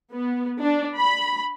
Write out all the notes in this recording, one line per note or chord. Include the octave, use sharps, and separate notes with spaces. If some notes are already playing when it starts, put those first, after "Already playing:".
B3
D4
B5